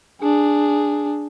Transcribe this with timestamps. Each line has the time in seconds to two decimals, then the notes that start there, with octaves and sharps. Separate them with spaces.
0.22 D4 G#4